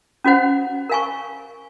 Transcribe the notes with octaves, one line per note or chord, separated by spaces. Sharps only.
C#4 F#4 C5 F#5
A#4 F5 G#5 C#6